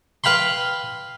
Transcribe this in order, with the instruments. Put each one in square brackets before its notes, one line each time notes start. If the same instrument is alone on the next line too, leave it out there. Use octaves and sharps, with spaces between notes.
[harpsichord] B4 F5 G5 B5 C6